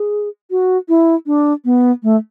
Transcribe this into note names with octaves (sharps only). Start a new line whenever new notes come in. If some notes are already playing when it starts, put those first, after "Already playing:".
Already playing: G#4
F#4
E4
D4
B3
A3